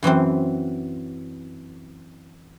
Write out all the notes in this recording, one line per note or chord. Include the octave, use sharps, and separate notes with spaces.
F#2 E3 F#3 C4